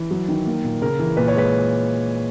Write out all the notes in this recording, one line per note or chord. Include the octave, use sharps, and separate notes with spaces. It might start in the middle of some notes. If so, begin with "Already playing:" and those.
Already playing: E3
F#3
D#3
A#3
A#2
C#3 A#4
E3
A#2 B4
C#5
G#3 B4